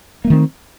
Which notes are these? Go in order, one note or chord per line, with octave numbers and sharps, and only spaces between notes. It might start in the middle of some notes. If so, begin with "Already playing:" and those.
D#3 A3 A#3 C4